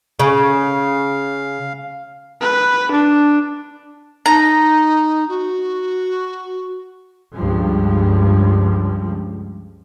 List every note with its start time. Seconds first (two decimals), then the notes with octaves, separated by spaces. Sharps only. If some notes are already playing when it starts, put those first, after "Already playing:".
0.19 C#3 F5
2.41 B4
2.91 D4
4.26 D#4 A#5
5.29 F#4
7.34 C#2 G2 F3